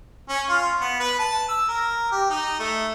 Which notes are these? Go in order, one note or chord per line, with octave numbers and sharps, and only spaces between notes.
C#4
F4
B3
B4
A5
E6
A#4
G4
D#4
A3